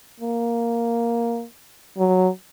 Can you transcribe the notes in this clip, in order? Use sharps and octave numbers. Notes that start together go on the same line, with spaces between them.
A#3
F#3